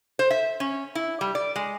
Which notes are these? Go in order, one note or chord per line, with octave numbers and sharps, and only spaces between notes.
C5
E5
C#4
E4
G3
D5
G#3